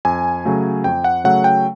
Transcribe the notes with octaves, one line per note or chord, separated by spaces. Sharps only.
F2 G#5
C#3 F#3 A3
F2 G5
F#5
C#3 F#3 A3 F#5
G5